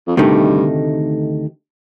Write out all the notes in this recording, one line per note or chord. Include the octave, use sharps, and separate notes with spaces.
F2
D2 G2 C3 D#3 A3 D#4